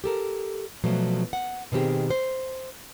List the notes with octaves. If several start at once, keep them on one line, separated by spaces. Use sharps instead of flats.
G4 A4 A#4
B2 F3 F#3 A3
F#5
B2 D#3 C4 G4 G#4
C5